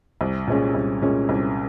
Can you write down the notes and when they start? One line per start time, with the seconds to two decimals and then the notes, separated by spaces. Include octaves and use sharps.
0.21 C2
0.47 A#2 G#3 C#4
0.74 C2
1.02 A#2 G#3 C#4
1.29 C2